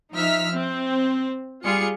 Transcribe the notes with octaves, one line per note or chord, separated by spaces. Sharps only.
F3 D#4 E5 F6 B6
C4
G3 F4 G#4 C#7